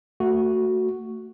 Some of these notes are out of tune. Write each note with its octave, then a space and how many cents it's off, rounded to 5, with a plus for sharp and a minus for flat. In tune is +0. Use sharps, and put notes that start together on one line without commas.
A3 +25 F#4 +0